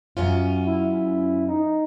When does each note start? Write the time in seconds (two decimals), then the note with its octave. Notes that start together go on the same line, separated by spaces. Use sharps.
0.17 F#2 C#4 F4
0.66 E4
1.48 D#4